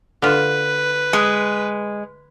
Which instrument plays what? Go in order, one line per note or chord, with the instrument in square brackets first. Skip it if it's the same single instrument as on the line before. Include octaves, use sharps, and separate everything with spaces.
[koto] D3 F4 [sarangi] B4
[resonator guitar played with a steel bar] G#3